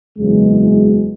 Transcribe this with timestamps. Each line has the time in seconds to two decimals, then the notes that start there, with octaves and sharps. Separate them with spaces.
0.18 F#1 E2 C#3 E3 F#3 G#3